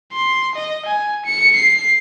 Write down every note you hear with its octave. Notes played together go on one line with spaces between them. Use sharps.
C6
D#5
G#5
C#7
C7